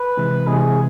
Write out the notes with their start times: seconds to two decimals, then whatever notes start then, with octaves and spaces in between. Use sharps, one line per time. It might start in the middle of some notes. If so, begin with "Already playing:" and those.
Already playing: B4
0.17 C3 E3 G#3
0.47 C3 E3 G#3 G#4